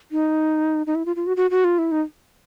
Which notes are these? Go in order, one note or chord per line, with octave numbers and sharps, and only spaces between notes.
D#4
D#4
E4
F4
F4
F#4
F#4
F#4
F4
E4
D#4